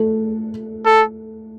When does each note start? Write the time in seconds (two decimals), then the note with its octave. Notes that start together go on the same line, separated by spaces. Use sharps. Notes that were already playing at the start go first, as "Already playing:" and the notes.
Already playing: A3 A4
0.86 A4